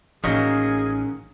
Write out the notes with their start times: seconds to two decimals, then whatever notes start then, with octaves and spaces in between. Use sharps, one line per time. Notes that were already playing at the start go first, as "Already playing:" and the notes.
0.24 A1 D#3 F#3 A#3 C#4 G#4